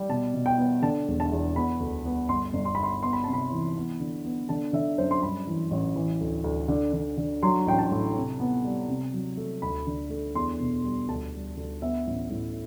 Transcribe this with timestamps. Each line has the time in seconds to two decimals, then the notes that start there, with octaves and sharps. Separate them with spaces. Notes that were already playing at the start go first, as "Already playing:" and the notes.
Already playing: G3
0.09 B2 A5
0.34 B2
0.46 G5
0.58 B3
0.82 D3 A5
1.08 E1
1.20 A5
1.32 E2
1.56 B3 B5
1.80 D2
2.05 B3
2.29 G1 C6
2.53 G1
2.65 C6
2.75 G1 B5
2.83 C6
3.03 B3 C6
3.13 B5
3.24 C3 A5
3.33 B5
3.51 E3
3.76 B3
4.00 D3
4.25 B3
4.49 D3 A5
4.73 D3 E5
4.98 F#2 C5
5.11 C6
5.23 G2 B5
5.47 E3
5.71 A1
5.96 E3
6.21 D2
6.44 D2
6.68 D3
6.93 D3
7.17 D3
7.43 F#3 C6
7.67 A1 G5
7.79 A5
7.91 A2
8.16 C3
8.40 B3
8.65 G3
8.88 C3
9.13 F#3
9.37 A3
9.62 D2 B5
9.87 D3
10.10 A3
10.35 E2 C6
10.60 B2
10.84 G3
11.08 D2 A5
11.34 G3
11.57 D2
11.82 B3 E5
12.07 A1
12.30 A2